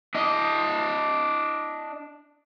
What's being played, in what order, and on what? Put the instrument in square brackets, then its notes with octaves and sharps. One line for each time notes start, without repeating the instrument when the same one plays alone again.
[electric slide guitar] D4 D#5